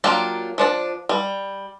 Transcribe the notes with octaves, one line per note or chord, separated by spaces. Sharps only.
F#3 A#3 D4 F4 G4
F3 D4 D5
G3